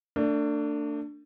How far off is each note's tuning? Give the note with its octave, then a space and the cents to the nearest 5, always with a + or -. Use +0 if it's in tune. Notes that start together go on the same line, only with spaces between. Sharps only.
A3 +35 D4 +0